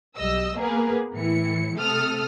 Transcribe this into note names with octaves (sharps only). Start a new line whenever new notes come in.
B1 G3 D#5 E6
A#3 B3 G#4 A#4 B4
A2 E3 E4 C#7
C3 A3 A4 D#6 F6